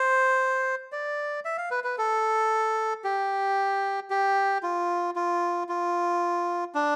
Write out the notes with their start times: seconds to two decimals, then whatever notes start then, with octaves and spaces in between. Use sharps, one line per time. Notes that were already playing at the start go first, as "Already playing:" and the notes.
Already playing: C5
0.92 D5
1.45 E5
1.57 F5
1.71 B4
1.84 B4
1.98 A4
3.04 G4
4.10 G4
4.63 F4
5.16 F4
5.69 F4
6.75 D4